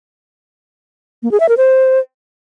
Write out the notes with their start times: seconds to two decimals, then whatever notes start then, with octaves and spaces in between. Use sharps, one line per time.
1.23 A#3
1.31 G#4
1.40 E5
1.49 A#4
1.57 C5